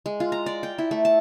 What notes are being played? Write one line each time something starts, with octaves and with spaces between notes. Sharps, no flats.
G#3
F4
A#5
D5
G5
E4
A3
A5